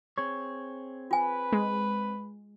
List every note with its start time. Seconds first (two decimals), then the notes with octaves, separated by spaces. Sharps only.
0.18 C4 G#4 C#5
1.11 F4 B4 G#5
1.52 G#3